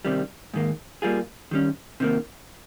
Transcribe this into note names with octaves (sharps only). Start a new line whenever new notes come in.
C3 D#3 G3
G#2 D#3 A#3
G3 A#3 F4 G#4
D#3 G3 C#4
C3 D#3 A#3